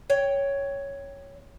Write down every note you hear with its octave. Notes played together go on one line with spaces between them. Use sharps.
C#5 G5